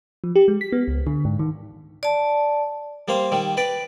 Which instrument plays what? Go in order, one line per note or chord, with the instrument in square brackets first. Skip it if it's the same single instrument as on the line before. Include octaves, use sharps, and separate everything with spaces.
[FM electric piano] F3
G4
G#3
B6
B3
C#2
D3
G#2
D#3
[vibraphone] D5 A5
[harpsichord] G3 A#3 C5 F5
D#3 G3
B4 D5 G5